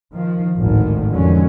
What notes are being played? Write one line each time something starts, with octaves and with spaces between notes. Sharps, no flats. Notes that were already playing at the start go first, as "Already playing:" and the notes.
D#3 F3
G#1 D2 A2 D#3
F2 D3 D#3 F#3 G#3 C#4